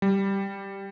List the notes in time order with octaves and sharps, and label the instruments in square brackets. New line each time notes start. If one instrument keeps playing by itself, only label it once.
[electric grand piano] G3